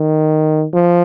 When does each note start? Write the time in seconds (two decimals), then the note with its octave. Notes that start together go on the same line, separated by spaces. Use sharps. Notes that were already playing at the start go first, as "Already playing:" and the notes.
Already playing: D#3
0.73 F3